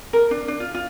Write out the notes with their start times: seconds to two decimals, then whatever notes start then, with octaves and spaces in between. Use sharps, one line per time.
0.13 A#4
0.31 D4
0.48 D4
0.60 F4
0.74 F4